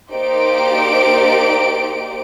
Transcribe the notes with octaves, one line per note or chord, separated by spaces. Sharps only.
A#3 D#4 G4 C5 D5 D7